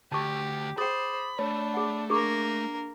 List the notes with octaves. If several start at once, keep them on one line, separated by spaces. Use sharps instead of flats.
D2 G4 A5 C#6
G#4 C5 G5 B5 D6 D#6 A6
A3 D4 C#5 B5
G#4 F#5
A#3 D4 G#4 A#4 C#6 D6